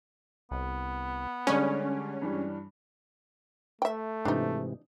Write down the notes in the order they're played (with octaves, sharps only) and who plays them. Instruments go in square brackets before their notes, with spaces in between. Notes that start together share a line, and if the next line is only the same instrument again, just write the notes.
[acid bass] C2 [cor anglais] B3
[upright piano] D3 G3 D5 [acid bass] G#3 [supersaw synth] C#4
[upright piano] G2 E3 G3
[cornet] A3 [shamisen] E5 G5
[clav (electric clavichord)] G#2 C3 E3 [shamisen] D4 D#4